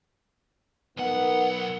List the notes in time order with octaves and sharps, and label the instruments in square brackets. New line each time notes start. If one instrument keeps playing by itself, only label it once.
[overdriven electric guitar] B1 F#5 [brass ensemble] B3 D#4 A#4